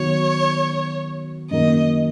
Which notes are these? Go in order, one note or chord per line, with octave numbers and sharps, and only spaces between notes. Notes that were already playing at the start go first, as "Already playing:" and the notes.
Already playing: D#3 F#3 B3 C#5
F#2 D#3 A#3 D#5